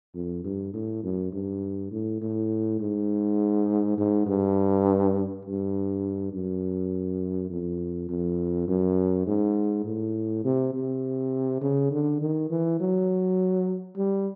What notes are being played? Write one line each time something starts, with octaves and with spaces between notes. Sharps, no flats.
F2
G2
A2
F#2
G2
A2
A2
G#2
G#2
G2
G2
F#2
F2
F2
F#2
G#2
A2
C3
C3
C#3
D3
D#3
E3
F#3
G3